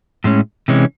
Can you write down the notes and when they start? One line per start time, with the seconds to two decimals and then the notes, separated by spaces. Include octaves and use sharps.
0.24 A2 G#3 C#4
0.68 C3 E3 G#3 C#4